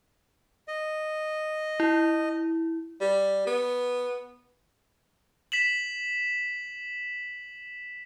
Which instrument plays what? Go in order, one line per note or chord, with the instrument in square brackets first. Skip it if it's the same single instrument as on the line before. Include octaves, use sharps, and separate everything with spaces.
[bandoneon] D#5
[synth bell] E4
[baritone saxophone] G3
B3
[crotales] B6 E7 F#7